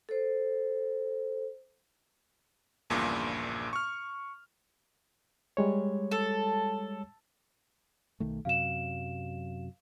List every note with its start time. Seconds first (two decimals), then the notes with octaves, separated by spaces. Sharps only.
0.09 A4 C5
2.90 A#1 E2 G2 A#2 C#3
3.73 C#6 F6
5.57 G3 G#3 C#5
6.11 A4
8.20 B1 D#3 A3
8.45 F#2 C3 F#3 F5 E7